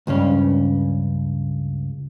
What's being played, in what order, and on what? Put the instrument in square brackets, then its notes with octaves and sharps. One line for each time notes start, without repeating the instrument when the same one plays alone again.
[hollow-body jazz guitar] C#2 G2 C#3 C#4